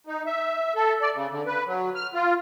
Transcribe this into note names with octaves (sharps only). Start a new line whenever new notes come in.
D#4
E5
A4
D5
C#3
D3
B4
F#3
F6
F4